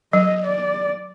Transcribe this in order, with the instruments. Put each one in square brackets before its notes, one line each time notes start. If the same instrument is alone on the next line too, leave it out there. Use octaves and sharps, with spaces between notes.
[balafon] F#3 [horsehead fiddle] D#5
[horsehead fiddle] D5